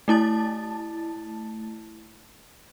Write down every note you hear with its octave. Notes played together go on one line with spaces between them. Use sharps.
A3 E4 A5 A6